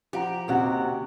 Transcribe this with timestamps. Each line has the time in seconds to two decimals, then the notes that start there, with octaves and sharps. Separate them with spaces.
0.13 F3 G4 F#5 A#5
0.48 D#2 C3 C#4 D#4 F#4 F#5